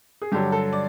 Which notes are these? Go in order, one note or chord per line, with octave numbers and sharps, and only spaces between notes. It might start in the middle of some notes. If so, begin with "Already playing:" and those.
G#4
G2 D3 F#3 G4
A4
D5